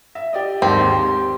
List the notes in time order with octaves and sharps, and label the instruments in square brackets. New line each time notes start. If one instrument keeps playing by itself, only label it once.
[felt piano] E5
G4 D5 D#5
[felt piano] D#2 G#2 [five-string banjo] C4
[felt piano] G4